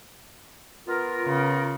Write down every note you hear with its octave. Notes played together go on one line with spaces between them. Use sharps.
B3 F4 A#4
C#3